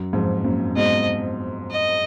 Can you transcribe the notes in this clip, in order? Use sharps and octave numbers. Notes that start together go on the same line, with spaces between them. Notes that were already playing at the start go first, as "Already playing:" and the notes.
Already playing: F#2
F2 G#2
F#2 A#2
G#2 B2 D#5
D#5